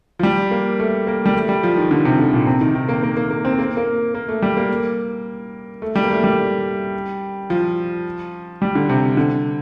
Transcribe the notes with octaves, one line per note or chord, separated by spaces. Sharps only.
F3
G3
A#3
A3
A#3
G3
A3
G3
F3
D#3
D3
C3
D3
A#2
C3
D#3
D#3
A#3
A#3
A#3
A#3
C4
A#3
A#3
A#3
A3
G3
A#3
A3
G3
A#3
A3
G3
F3
G3
D3
C3
D3